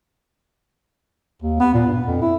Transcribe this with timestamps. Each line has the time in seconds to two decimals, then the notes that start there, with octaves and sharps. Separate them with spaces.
1.42 D#2
1.60 B3
1.74 A#2
1.87 G2
2.06 F2
2.22 E4